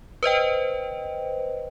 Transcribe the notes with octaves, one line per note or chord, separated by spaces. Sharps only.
B4 C5 D#5 G5